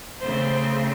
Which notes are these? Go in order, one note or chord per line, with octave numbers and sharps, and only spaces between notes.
C#3 A3 C4 C5